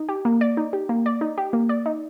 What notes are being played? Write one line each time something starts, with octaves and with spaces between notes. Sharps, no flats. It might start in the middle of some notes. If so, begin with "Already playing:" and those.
Already playing: D#4
G4
A#3
D5
D#4
G4
A#3
D5
D#4
G4
A#3
D5
D#4